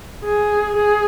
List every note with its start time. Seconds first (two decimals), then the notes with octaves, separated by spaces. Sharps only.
0.24 G#4
0.77 G#4